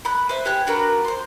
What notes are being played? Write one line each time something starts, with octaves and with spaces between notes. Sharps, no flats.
B5 F#6
B4 C5 E5
B3 G4 G#5 F#6
D4 F#4 A#4 B4
C5 C6